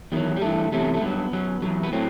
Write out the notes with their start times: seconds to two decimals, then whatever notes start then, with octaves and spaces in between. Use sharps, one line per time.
0.12 E2 D#3 F#3 G3
0.36 G3
0.41 G2 E3 A3
0.72 E2 C3 F#3 A3
0.94 A3
1.01 G2 F#3 B3
1.33 F#2 F#3
1.62 B2 F#3
1.66 E2
1.83 B3
1.92 A2 F#3 C4